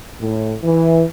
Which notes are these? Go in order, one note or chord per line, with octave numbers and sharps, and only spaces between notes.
A2
E3